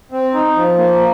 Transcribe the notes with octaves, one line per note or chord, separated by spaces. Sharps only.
C4
D#4
F3
A#3